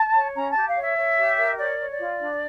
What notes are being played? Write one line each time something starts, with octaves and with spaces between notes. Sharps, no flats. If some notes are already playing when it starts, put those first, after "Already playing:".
Already playing: A5
C#5
C#4 A#5
G4 A5
F5
C#5
E5
C#5
G4
A#4
C#5 D5
C#5
D5
F4
D4